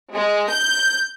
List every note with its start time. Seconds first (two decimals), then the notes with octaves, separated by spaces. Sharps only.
0.13 G#3
0.49 G6